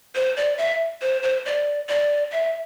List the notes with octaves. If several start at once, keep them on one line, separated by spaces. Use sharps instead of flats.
C5
D5
E5
C5
C5
D5
D5
E5